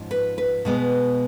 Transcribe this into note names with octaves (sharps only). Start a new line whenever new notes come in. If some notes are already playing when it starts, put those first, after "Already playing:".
Already playing: G#2 F3 C#4
B4
B4
B2 G#3 B3